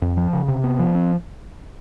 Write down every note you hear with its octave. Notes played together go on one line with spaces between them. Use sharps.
F2
F3
C#3
C3
B3
F3
C4